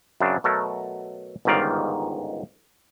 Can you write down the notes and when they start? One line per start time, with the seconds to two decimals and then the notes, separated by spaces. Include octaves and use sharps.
0.21 F#2 C#3 C4 D4
0.44 B2 F#3 A3 A4 A#4
1.45 G1 C#2 G#2 D#3 D5 F5